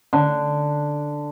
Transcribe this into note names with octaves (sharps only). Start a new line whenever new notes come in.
D3